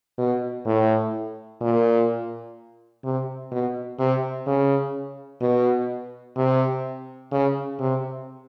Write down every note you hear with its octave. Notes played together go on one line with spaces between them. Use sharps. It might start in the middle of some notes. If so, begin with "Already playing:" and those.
B2
A2
A#2
C3
B2
C3
C#3
B2
C3
C#3
C3